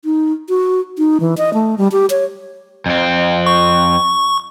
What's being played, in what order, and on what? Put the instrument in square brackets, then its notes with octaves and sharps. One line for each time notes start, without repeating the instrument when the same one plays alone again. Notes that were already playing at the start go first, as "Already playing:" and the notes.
[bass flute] D#4
F#4
D#4
E3
D#5
A3
G3
G4
C#5
[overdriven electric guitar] F2 C4
[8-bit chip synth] C#6